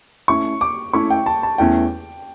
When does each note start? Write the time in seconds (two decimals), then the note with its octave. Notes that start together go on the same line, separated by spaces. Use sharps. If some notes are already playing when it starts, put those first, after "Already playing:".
0.28 A3 C#4 E4 C#6
0.61 D6
0.93 A3 C#4 E4 C#6
1.10 G5
1.26 A5
1.43 A5
1.58 E2 E3 A3 C#4 G5